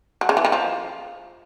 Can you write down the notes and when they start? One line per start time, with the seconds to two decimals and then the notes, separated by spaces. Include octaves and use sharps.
0.21 F#3
0.29 C#3
0.37 E3
0.45 D#3
0.52 F3